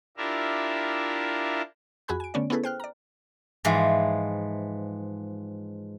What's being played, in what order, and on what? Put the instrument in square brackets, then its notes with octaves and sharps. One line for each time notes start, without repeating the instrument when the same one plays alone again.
[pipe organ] D4 E4 F4 G4 A#4 E5
[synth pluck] F2 F#4 G#4 G#5 B5 F#6
G#5 D7
D3 A3 B3 C#4 C#5 D5
B3 C#4 E4 G#4 A4 B4
C5 G5 F6 F#6
D5 A#5
[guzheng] G#2 E3 F3